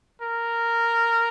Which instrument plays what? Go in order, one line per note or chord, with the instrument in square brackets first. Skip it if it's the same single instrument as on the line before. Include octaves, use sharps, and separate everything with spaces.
[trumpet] A#4